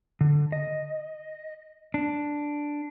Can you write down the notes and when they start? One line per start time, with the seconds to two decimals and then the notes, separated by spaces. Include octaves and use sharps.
0.21 D3
0.52 D#5
1.94 D4